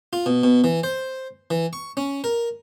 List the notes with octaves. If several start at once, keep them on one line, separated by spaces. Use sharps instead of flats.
F4
B2
B2
E3
C5
E3
C#6
C#4
A#4